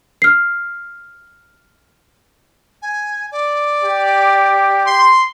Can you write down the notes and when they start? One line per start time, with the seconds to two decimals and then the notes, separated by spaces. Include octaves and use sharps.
0.22 F6 C7
2.82 G#5
3.32 D5
3.83 G4
4.87 C6